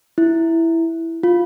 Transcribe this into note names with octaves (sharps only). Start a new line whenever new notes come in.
E4
F4